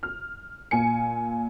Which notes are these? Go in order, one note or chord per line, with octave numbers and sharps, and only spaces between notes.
F6
A#2 G#5 C#7